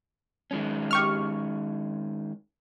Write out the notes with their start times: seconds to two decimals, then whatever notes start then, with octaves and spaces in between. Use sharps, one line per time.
0.51 D#3 G#3 C#4
0.91 G4 C#6 F6